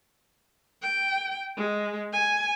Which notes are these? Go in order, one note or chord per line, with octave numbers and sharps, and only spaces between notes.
G5
G#3
G#5